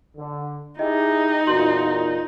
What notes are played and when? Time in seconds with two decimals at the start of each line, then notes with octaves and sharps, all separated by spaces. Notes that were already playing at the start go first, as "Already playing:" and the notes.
0.17 D3
0.79 D#4 E4 G4 G#4 D#5
1.47 E2 A#2 F#4 C6 F#7